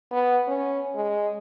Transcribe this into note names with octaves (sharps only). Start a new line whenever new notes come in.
B3
C#4
G#3